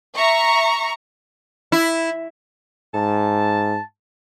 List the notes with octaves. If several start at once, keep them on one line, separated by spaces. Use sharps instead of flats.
E5 A#5 C#6
E4
G#2 A5